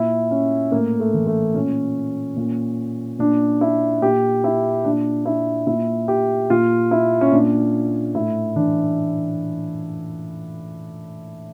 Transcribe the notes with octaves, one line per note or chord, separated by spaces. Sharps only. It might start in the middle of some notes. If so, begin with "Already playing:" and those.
Already playing: A#2 E4
C#4
A2 A#3
A3
E3
A3
A#2 C#4
A#2
A#2 D4
E4
A#2 G4
E4
A#2 D4
E4
A#2 E4
G4
A#2 F4
E4
C#4
A#2 D4
A2 E4
E3 D4